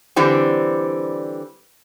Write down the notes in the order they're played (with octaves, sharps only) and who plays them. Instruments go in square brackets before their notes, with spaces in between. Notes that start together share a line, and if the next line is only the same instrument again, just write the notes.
[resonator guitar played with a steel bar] D3 E3 G3 C4